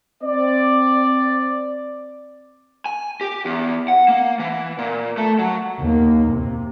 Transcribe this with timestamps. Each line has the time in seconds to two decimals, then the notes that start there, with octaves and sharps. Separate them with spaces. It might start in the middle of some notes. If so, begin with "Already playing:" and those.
0.23 C4 D5
2.86 G#5
3.21 G4
3.45 E2
3.88 F#5
4.08 A#3
4.39 E3
4.78 A#2
5.17 A3
5.39 F#3
5.79 D#2 A#3
6.30 C3